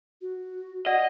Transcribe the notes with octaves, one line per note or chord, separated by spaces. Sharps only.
F#4
D5 D#5 F#5